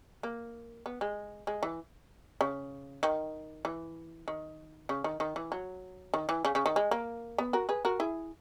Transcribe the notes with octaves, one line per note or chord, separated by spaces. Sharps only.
A#3
B3
G#3
G#3
E3
C#3
D#3
E3
D#3
C#3
D#3
D#3
E3
F#3
D#3
E3
C#3
C#3
D#3
G#3
A#3
B3
F#4 A#4
G#4 B4
F#4 A#4
E4 G#4